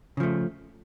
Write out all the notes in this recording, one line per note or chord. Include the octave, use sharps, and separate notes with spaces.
C#3 F3 A3